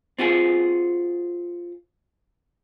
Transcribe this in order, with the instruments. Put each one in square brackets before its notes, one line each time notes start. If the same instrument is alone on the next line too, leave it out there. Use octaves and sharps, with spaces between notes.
[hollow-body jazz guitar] C4 F4 F#4 G#4